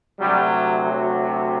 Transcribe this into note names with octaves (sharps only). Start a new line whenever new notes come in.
D2 C3 F#3 G3
F#3